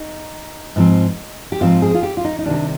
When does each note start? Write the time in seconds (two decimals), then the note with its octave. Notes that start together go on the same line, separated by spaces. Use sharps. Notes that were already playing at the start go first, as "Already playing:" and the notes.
Already playing: D#4
0.76 G#2 F3 C4
1.52 G4
1.61 G#2 F3 C4 F4
1.82 G#4
1.94 F4
2.03 G4
2.17 F4
2.24 D#4
2.39 D#4
2.46 C3 D#3 G3 D4